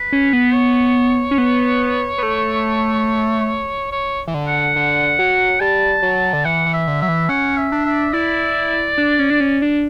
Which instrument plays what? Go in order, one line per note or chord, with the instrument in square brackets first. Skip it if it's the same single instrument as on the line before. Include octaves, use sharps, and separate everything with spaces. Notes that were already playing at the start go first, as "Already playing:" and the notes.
Already playing: [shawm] B4
[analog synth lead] C#4
B3
[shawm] C#5
[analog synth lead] C#4
B3
B3
A3
[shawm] C#5
[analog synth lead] E3
D3
[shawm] F#5
[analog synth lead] D3
F#3
[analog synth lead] G3 [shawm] A5
[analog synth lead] F#3
D3
[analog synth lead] E3 [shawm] F#5
[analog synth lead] E3
[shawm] E5
[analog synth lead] D3
[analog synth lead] F#3 [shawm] E5
[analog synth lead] E3
[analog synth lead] C#4 [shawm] F#5
[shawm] E5
[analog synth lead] D4
[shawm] E5
[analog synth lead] E4 [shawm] D5
[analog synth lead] D4
C#4
D4
C#4
D4